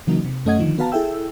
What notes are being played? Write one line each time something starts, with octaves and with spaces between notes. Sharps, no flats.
C#3 E3 F#3 A#3 D#4
C3
F#2 A3 C#4 D#5 F#5 G#6
D3 D#3 F3
B3 F#4 B4 F5 A5 A#5
E4 G#4 A4 E5 G5 E6